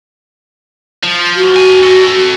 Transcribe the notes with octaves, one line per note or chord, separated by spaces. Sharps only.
F3
F#4
D4 G#5
A4 D#5